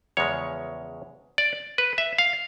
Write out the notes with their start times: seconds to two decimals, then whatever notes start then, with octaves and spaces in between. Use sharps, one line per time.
0.17 E2 C#3 F3 G#3 C#4 C#5
1.38 D5
1.78 B4
1.98 E5
2.18 F5